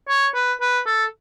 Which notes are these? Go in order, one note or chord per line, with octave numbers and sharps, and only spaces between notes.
C#5
B4
B4
A4